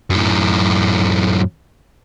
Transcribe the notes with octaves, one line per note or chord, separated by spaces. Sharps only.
F#2 A2